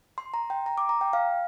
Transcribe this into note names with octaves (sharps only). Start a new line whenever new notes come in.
C6
A#5
G5
A#5
D6
A#5
G5
F5